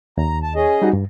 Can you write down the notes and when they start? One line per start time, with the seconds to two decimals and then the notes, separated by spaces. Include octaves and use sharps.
0.18 D#2 A#5
0.43 A5
0.55 C#4 G#4 D#5
0.82 G3 D#4 F#4
0.93 G2